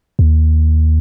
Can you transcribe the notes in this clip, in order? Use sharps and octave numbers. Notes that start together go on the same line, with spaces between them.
D#2